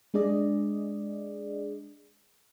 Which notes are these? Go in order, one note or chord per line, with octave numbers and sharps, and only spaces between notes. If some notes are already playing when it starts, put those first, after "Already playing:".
G#3 D4 G#4 D5 D#5